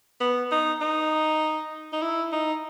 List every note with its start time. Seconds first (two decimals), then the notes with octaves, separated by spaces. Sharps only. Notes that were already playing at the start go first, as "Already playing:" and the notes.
0.21 B3
0.52 D#4
0.81 D#4
1.93 D#4
2.02 E4
2.32 D#4